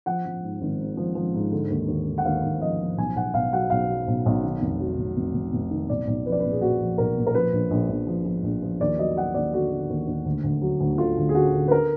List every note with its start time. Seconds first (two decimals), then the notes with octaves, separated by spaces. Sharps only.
0.06 F3 F#5
0.25 F3
0.43 G#2
0.61 G#1
0.80 G#2
0.97 F3
1.15 F3
1.34 G#2
1.52 D3
1.70 D#2
1.88 D#2
2.06 D3
2.18 F#5
2.25 D#2 F5
2.43 D#2
2.61 F3 D#5
2.80 F3
2.97 B1 G#5
3.16 B1 F#5
3.34 B1 F5
3.53 F#3 F#5
3.70 B1 F5
3.89 F#3
4.08 B1
4.26 B1
4.43 D#3
4.61 F1
4.80 F#3
4.99 F1
5.16 F1
5.34 F1
5.53 F1
5.71 D#3
5.90 B1 D5
6.07 B1
6.26 F3 B4
6.32 D5
6.39 A#2 B4
6.51 G#4
6.61 A#2 F#4
6.81 F3
6.98 B1 A#4
7.17 A#2
7.27 A#4
7.35 F3 B4
7.53 A#1
7.71 A#1
7.89 A#1
8.07 F3
8.25 F3
8.43 A#1
8.62 F3
8.80 D#2 D5
8.98 F#3 D#5
9.17 F#3 F#5
9.35 D#2 D5
9.53 D3 F#4
9.72 D3
9.90 D#2
10.07 D#2
10.25 D2
10.44 D2
10.62 F#3
10.81 D2
10.98 D3 F4
11.18 D2
11.29 G#4
11.35 D3 F#4
11.53 D3
11.68 B4
11.71 A#4